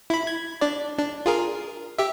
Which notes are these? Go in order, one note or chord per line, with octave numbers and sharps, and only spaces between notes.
E4 B5
G#6
D4 D5
D4
F4 G#4 A#4
G4 E5